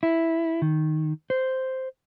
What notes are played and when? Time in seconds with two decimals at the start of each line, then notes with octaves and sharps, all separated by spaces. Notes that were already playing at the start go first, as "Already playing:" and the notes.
0.03 E4
0.62 D#3
1.30 C5